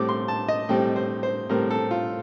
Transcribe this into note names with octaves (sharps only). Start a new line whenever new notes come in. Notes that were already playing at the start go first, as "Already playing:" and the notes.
Already playing: A2 G3 C4 D6
C6
A5
D#5
A2 G3 C4 G5
C5
C5
A2 G3 C4 A#4
A4
F4